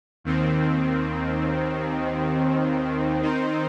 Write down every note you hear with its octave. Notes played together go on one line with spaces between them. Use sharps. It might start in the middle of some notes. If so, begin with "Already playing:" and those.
D#2 D#3 C4
D#3 C4 D#4 C5